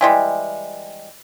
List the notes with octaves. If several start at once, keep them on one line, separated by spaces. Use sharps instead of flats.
E3 G3 G#3